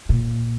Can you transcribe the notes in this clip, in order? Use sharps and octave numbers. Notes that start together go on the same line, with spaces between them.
A#2